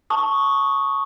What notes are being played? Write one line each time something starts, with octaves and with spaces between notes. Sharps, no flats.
A5 C#6 D#6